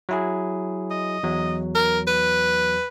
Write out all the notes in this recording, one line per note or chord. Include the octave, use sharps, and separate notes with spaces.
F#3 E4 G#4
D#5
E2 F#3
A#4
B4